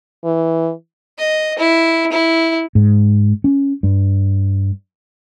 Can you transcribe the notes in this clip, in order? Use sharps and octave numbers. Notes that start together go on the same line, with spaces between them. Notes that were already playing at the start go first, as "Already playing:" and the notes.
E3
D#5
E4
E4
G#2
C#4
G2